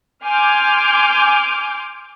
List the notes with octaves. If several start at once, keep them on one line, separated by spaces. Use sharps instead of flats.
G#5 C6 D6 F6 G6